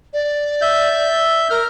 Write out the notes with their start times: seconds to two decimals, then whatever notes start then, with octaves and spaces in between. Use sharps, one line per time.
0.13 D5
0.61 E5 G6
1.50 A#4 F6